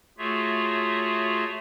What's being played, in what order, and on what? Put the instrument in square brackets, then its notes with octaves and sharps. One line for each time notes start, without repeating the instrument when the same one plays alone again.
[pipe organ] A3 F4 F#4 G#4 C#5 E5